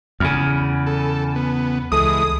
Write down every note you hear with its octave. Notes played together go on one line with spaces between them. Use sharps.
E2 C#3 G#5 B5 F6
A4
B3
C#2 E3 G#3 A4 D#6